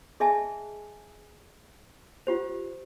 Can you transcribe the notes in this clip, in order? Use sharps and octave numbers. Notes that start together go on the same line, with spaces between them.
G#4 D#5 E5 G#5 A5
F4 G4 C5